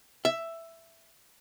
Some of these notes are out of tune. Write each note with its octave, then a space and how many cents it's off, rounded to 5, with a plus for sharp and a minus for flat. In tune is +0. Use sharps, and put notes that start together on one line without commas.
E5 +5